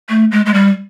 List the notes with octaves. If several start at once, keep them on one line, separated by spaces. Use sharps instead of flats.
A3
G#3
G#3
G3